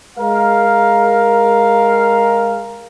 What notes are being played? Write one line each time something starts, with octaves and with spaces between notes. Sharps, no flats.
G#3 A#4 F5